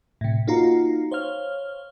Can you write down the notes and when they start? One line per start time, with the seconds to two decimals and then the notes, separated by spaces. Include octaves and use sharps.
0.21 A2 C3
0.47 A#3 D#4 F4 F#4 A#5
1.12 C5 C#5 F5 F6